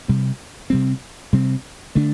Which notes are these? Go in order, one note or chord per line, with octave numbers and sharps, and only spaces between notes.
C3 G3 C4
C3 G3 C4
C3 G3 C4
D3 A3 D4